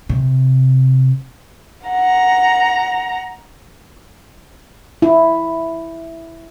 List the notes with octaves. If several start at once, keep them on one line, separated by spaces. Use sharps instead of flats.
C3
F#5 A#5
E4